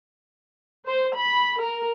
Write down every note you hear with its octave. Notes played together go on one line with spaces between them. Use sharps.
C5
B5
A#4